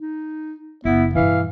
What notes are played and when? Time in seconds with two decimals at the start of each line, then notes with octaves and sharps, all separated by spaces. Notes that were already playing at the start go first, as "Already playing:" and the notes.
0.01 D#4
0.85 F#1 B3 E4
1.15 G2 B2 E3 F5